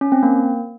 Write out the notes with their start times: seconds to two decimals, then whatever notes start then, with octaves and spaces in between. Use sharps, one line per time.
0.01 C#4
0.12 C4
0.23 A#3